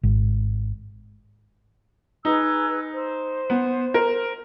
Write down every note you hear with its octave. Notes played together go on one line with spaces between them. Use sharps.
G#1
D#4 G#4 B4 E6
C5
B3
A#4